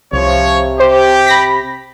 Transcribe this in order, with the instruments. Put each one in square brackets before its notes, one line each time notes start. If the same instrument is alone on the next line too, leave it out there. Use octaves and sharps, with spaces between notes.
[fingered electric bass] C2 [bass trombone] C3 [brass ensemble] F3 C#5
[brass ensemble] G4 [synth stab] C5
[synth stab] B5 A#6 B6